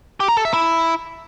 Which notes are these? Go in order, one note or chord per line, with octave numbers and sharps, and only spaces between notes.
G4
A#5
A4
E5
E4